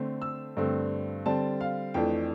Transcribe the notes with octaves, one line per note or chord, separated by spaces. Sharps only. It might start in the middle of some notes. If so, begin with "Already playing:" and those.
Already playing: D3 A3 C4
E6
G2 D3 A3 C4
D3 G3 C4 A5
F5
F2 E3 A3 D4 G5